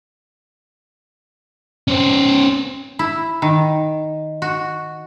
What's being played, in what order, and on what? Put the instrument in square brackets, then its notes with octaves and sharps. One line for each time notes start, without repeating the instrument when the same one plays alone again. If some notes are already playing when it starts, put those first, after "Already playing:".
[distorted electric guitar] C#4 C5
[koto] E4
D#3
F#4